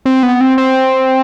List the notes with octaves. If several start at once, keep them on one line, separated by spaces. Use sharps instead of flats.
C4
B3
C4
C4